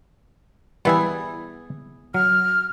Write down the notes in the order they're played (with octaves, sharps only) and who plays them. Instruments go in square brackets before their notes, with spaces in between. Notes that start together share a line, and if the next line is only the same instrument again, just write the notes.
[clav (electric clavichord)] E3 G3 [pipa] B3 E4 G#4
[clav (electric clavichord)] F#3 [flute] F6